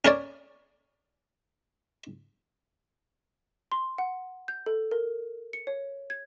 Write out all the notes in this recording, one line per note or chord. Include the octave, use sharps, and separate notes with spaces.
C#4 A#4 C#5 D5
C6
F#5
G6
A4
A#4
C#7
C#5
G#6